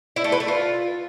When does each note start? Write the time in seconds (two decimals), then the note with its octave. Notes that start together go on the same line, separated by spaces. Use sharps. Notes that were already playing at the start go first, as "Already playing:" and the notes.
0.16 E4
0.24 A3
0.32 B4
0.40 A3
0.48 F4